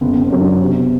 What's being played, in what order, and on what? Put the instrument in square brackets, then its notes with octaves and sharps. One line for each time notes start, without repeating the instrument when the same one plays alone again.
[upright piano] F#1 [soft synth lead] B3
[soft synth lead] B3
C4
[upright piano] F#2 F#3
[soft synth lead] D4
[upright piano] C3 [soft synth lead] B3